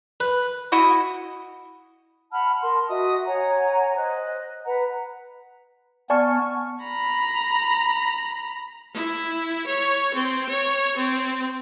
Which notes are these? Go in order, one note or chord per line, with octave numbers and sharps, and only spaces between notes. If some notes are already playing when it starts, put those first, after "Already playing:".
B4
E4 F#4 D#5
F#5 A5 B5 F6
A#4 A5 C6
F#4 D#5 E5 D#6
C#5 F#5 G#5 A#5
C5 D#5 F#6
B4 F#5 A#5
B3 D5 G#5 A5 C#6 F6
A#5 B5
E4
C#5
C4
C#5
C4